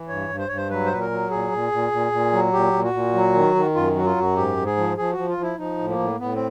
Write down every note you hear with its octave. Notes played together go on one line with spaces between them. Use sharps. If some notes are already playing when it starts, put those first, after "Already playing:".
Already playing: E3
G2 C#5
G2
C5
G2 C#5
C5
F#3 B4
C5
A#2 B4
A#4
F#3
A#2 G#4
A#2
A#2
A#2
A#2
F#3
A#2 G4
A#2
F#4
A#2
F#3
D#3
D#3
F#2 F4
F#3 F#4
F4
F#2 F#4
G#2 G4
G#2
G#4
F3
F3 G#4
F#4
F3
F4
F3
E4
F3 D#4
A2
A#3
A2
A2 B3
C4